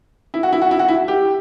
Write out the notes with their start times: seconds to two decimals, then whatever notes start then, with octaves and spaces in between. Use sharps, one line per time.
0.34 E4
0.43 F#4
0.53 E4
0.62 F#4
0.71 E4
0.79 F#4
0.88 E4
1.08 G4